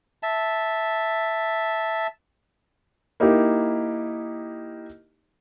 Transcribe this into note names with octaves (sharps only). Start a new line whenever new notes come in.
E5 A5
A#3 D#4 E4 G4